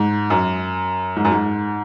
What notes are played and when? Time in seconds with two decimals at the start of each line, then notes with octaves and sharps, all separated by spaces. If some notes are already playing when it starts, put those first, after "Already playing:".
Already playing: G#2
0.30 F#2
1.16 G#2
1.25 F#2
1.32 G#2